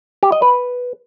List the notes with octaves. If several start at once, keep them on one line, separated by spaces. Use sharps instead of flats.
G4
D#5
B4